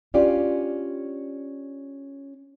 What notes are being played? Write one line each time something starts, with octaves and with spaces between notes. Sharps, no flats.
C#4 D4 F4 G4 D5